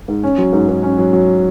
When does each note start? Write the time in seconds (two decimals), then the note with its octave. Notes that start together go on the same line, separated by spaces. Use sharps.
0.08 G#2
0.24 C#4
0.38 F#3
0.53 G#2
0.68 G#2
0.83 C#4
0.98 F#3
1.13 F#3